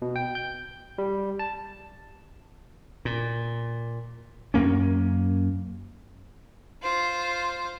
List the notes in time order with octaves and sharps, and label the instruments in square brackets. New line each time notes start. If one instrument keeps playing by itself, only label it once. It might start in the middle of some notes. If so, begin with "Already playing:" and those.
[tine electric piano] B2
G5
G6
G3
A5
[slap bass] A#2
F#2 A#3 C#4
[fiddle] F4 C5